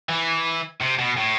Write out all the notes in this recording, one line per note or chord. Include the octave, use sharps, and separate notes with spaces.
E3
C3
B2
A2